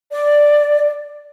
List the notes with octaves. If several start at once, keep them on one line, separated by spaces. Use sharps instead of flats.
D5